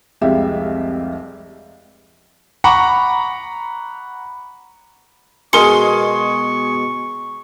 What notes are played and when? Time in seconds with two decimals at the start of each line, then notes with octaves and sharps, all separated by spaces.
0.21 F1 C2 G#3 G4 E5 F5
2.64 F#5 A#5 B5 C#6 D6
5.53 B2 G#3 A#4 G#5 C6 C#6 D#6 C#7